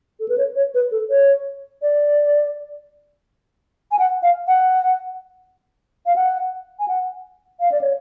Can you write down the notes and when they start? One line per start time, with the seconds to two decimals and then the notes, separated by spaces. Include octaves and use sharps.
0.20 A4
0.29 B4
0.38 C#5
0.56 C#5
0.74 B4
0.91 A4
1.10 C#5
1.82 D5
3.91 G#5
3.99 F#5
4.23 F5
4.47 F#5
6.06 F5
6.16 F#5
6.79 G#5
6.88 F#5
7.60 F5
7.72 D5
7.81 C#5